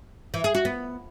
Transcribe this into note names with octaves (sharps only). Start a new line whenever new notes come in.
E3
G#4
F#4
B3